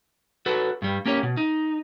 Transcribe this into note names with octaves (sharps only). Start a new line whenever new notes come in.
F#4 A4 B4
G2 G3
A#3 C#4 G4 C#5
B2
D#4